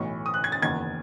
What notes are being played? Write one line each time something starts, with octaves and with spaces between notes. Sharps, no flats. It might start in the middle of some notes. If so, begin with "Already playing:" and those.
Already playing: B1 A2 E3 C#6
D#6
F#6
G#6
A6
F#1 E2 D#3 G#6